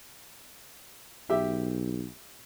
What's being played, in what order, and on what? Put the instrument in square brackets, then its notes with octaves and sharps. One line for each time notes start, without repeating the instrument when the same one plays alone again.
[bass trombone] B1 [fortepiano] G4 E5